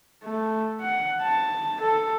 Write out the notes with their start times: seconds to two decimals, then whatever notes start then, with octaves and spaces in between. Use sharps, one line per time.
0.24 A3
0.81 F#5
1.22 A5
1.81 A4